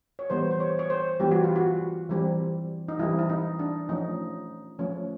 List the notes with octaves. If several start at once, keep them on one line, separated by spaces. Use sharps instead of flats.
C#5
E3 G3 B3 C5
C5
C#5
C#5
C5
E3 G3 B3 G4
F#4
F4
F#4
E3 G3 C4
D#4
E3 G3 C4 E4
E4
D#4
D4
F3 A3 C#4 D#4
F3 A3 C#4